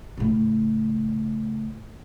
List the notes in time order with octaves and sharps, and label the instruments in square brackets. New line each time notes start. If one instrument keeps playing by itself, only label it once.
[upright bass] A2 C#3